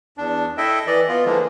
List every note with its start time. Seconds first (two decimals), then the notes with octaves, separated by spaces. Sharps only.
0.18 E2 D4
0.58 E4 A4 D#5 E5 G5
0.87 E3 D5 D#5
1.09 B3 F4
1.25 D3 E3 F3 G#3 A#3